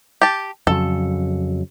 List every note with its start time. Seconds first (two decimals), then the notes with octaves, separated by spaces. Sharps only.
0.22 G4 A5
0.67 F2 C#3 F#3 A4